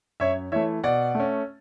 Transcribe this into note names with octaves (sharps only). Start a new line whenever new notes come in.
F#2 C#5 E5
E3 A3 C#5 E5
B2 D5 F#5
A3 C#4